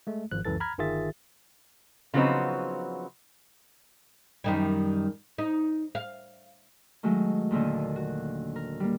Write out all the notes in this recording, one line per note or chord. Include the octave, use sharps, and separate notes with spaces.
G#3 A3
G#1 F3 F#6
C#2 F#2 E3 A4 A6
A#5 B5 F6 G#6
G1 D#3 F4 G#4 E5 A6
C#3 F3 F#3 B3 C4 D#4
F#2 D#3 G3
D#4
F5
D#3 F#3 G#3 A3
D#2 A#2 D3 D#3
F#4
A#4
G3 A#3